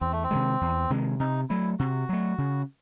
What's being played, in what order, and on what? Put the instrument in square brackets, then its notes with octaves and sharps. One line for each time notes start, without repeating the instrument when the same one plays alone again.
[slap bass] E2 [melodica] C4
[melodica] A3
C4
[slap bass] C3 D#3 G#3
E2
C3 D#3 G#3
[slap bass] C3 [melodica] D#4
[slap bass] F#3 A3 [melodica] E4
[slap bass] C3 [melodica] F#4
[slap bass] F#3 A3
C#3